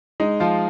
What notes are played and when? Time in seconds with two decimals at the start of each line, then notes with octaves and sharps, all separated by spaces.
0.20 G#3 D#4
0.40 F3 F4